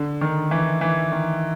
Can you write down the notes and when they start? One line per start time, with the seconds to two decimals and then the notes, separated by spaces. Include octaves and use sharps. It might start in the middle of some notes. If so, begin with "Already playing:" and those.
Already playing: D3
0.21 D#3
0.51 E3
0.81 E3
1.12 D#3